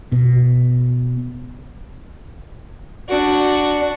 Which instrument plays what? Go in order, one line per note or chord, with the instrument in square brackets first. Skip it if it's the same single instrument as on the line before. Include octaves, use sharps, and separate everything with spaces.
[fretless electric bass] B2
[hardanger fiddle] D4 F#4